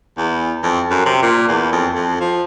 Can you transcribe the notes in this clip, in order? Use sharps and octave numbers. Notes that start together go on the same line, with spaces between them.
E2
F2
F#2
C3
A#2
E2
F2
F2
F3